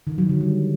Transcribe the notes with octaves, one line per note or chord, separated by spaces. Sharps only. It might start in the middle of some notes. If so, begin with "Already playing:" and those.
D#3
F#3
D3
G3